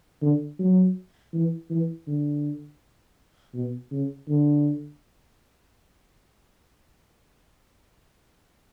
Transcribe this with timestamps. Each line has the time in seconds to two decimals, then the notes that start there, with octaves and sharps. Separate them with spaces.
0.22 D3
0.59 F#3
1.33 E3
1.70 E3
2.07 D3
3.54 B2
3.92 C#3
4.28 D3